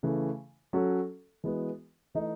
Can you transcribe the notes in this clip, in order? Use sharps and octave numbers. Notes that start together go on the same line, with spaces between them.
C#3 E3 A3
F#3 C#4 F#4 A4
E3 G#3 B3 F#4
E3 A3 D#4